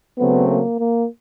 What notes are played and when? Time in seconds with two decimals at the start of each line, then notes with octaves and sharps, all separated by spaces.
0.18 C#3 F#3 A3 B3 C4
0.49 A#3
0.80 A#3